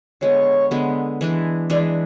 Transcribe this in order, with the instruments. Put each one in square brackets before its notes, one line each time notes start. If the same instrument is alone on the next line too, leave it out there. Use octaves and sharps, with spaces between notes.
[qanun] D3 G#3 B3 [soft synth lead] C#5
[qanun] D3 G#3 B3
E3 G#3 D4
[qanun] E3 G#3 D4 [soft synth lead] D5